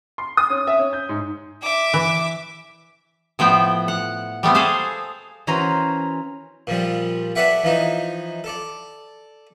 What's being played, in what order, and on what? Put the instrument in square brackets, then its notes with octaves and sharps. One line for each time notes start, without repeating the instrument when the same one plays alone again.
[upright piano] C6
D#6
C#4
E5
C#4
G6
G#2
[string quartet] E5 D6
[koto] E3
A2 F3 B3 G5
F#5
G3 A3 B3 C4
G#4 A4 C5 F5
[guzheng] E3 C#4 F#4 A#4 C5 A#5
[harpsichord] A#2 F3 G3
A4 B4 D5 E5 F#5 G5
E3 F3 D#4
A4 D5